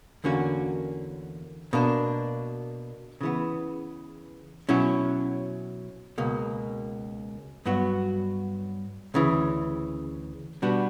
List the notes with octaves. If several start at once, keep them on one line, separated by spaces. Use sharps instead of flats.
E2 D3 A#3 C#4 F#4
B2 A#3 D4
C#3 E3 B3
B2 F#3 C#4 E4
C#2 B2 A#3
G2 F#3 B3 F#4
D2 C#3 E3
B2 G3 B3 D4 F#4